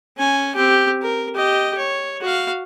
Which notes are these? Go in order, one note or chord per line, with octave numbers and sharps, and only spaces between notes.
C#4 G#5
C4 G4
A#4
G4 D#5
C#5
F#4 F5